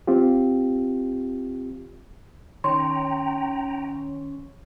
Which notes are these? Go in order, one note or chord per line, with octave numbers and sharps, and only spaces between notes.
C4 F4 G4
D#3 C#4 C#5 G5 A#5 C6 C#6